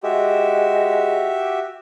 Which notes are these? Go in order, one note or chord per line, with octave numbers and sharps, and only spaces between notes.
G#3 F#4 G4 E5